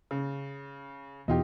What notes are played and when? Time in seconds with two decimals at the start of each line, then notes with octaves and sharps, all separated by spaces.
0.11 C#3
1.28 E2 B2 D#4 F4 G4